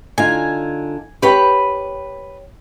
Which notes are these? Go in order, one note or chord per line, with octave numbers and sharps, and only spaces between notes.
D3 D#4 F4 G#5
G4 B4 C#5 G5 B5